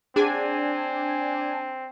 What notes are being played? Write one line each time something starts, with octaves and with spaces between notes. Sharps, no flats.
C4 D4 G#4 F#5 G#5